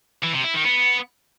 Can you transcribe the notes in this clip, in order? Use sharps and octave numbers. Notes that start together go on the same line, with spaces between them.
E3
C3
E4
D#3
B3